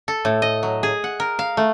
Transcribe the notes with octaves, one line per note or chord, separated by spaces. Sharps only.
A4
A2
D#5
F#3
G#4
F#5
A#4
F5
A3